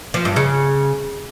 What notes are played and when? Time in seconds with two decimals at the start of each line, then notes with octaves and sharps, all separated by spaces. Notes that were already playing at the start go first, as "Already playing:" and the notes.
0.14 F3
0.25 G2
0.36 C#3